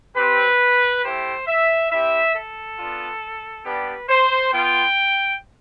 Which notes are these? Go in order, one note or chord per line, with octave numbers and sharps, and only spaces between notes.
C4 G4 B4
A3 E4 G4 C5
E5
C4 E4 G4 E5
A4
B3 D4 F4
G3 B3 D4 G4 B4
C5
B3 F4 G5